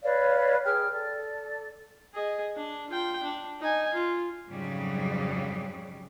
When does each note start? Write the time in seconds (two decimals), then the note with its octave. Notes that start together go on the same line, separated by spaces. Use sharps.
0.02 B4 C#5 D5 F5
0.65 G#4 B4 G5 F6
0.91 A4 D5
2.13 G#4 D#5
2.56 D4
2.90 F4 G5
3.23 D4
3.61 D#4 G#5
3.94 F4
4.48 F2 G#2 C#3 F#3 G3